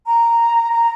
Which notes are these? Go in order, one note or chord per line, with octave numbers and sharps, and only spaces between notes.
A#5
A#5